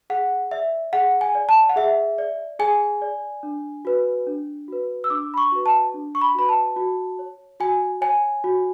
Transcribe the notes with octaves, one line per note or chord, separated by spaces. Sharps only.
G#4 F#5
D5 E5
G#4 F#5
G#5
D5
A5
F#5
G#4 E5
D5
G#4 G#5
D5
D4
F#4 B4
D4
F#4 B4
E6
D4 D6
B5
C#6
F#4 B4
A5
D4
C#6
B5
F#4 B4 B5
A5
F#4
C#5
F#4 G#5
C#5 G#5
F#4